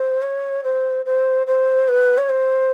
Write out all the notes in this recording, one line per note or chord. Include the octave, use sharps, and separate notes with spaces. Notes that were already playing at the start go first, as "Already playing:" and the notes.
Already playing: C5
C#5
C5
C5
C5
B4
C#5
C5